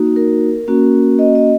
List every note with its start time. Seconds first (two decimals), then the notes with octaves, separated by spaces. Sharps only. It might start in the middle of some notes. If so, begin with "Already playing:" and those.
Already playing: A#3 D#4 F#4
0.16 A#4
0.68 A#3 C#4 F#4
1.19 D#5
1.35 D#5